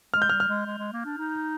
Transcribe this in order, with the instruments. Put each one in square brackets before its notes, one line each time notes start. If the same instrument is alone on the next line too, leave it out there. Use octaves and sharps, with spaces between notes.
[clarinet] G#3 [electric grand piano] F6
[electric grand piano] G6
[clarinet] G3 [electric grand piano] F6
[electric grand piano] F6
[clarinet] G#3
G#3
G#3
A#3
D4
D#4